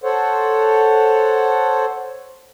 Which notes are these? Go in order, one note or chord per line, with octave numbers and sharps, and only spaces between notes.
A4 C5 C#5 F#5